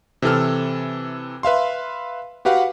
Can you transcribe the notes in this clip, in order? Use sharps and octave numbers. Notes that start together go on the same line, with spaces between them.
C3 E3 A4 F6
B4 E5 F5 C6
F#4 G4 B4 F5 F#5